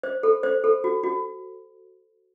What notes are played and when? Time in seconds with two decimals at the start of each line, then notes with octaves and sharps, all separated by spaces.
0.03 C5
0.23 A4
0.43 C5
0.64 A4
0.84 F#4
1.04 F#4